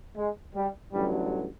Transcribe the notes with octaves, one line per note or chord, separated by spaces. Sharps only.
G#3
G3
A1 G2 D3 F#3 G3